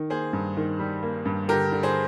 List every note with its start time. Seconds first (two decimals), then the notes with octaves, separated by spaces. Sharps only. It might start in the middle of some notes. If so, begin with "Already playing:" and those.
Already playing: D#3
0.10 A#3 G#4 C5
0.33 G2
0.57 D#3
0.79 G3
1.03 A#3
1.25 G2
1.48 D3 G4 A#4
1.72 D3
1.83 G#4 C5